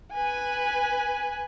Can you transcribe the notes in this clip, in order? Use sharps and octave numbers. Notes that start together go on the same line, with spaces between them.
B4 G#5